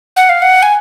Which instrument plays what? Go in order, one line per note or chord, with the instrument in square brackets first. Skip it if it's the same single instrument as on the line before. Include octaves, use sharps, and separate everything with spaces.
[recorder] F#5
F5
F#5
G#5